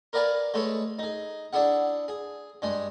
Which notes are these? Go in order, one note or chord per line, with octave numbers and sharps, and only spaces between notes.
A#4 B4 D5 F5 G#5 A#5
G#3 A3 B4 C#5
D#4 G#4
D4 E4 G#4 F#5
G#4
G2 G#3 G#4